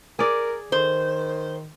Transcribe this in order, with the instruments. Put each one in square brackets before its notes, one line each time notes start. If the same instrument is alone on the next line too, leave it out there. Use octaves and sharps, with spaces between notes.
[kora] G#4 D5 [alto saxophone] A#4
[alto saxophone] D#3 [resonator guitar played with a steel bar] C5